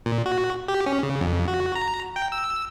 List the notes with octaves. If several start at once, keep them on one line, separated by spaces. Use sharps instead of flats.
A#2
F#4
G4
C#4
C#3
F2
F#4
A#5
G5
E6